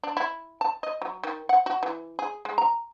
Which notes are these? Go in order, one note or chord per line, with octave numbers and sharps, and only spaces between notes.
D4
E4
A5
D#5
F#3
D#3
F#5
F#4
E3
G#4
G#3
A#5